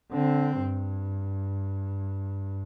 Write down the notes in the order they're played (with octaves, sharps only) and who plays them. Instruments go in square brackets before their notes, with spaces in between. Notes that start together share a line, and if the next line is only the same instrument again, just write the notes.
[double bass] D3 C4
G2